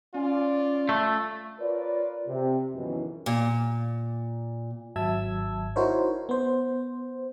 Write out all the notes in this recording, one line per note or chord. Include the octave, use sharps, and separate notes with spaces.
C#4 F4 D5
A3
F4 A#4 B4 C#5 D5
C3
C#2 F#2 B2 D#3 E3
A#2
G#1 F#3 E5 A5 E6 G#6
D#4 E4 F#4 A#4 C5 C#5
B3 C5